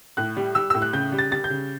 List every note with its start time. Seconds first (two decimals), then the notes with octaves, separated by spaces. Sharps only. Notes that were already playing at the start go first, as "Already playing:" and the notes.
0.17 A2 F#6
0.37 G3
0.55 G3 E6
0.70 A2 E6
0.82 F#6
0.93 C#3 G6
1.12 G3
1.19 A6
1.31 G3 A6
1.44 G6
1.50 C#3